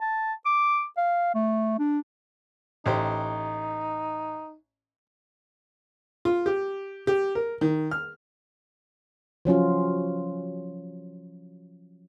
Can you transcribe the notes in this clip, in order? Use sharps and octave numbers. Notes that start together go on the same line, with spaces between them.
A5
D6
F5
A3
D4
A1 D#4 G4 C5
F4
G4
G4
A#4
D#3
F6
F3 F#3 C#4 F4